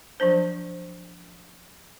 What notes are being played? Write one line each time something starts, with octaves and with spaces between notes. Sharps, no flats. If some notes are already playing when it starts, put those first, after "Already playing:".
F3 F#3 D4 C5